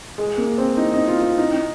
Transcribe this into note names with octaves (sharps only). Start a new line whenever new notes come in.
G#3
A#3
C4
D#4
D#4
F4
F4
D#4
D#4